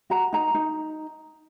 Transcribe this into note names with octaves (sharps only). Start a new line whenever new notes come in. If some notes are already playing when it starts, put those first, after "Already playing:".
F#4 A#5
D#4 A#5
D#4